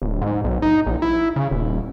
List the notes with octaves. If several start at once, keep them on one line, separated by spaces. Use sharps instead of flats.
D1
G#2
B1
D#4
A#1
E4
C#3
D#1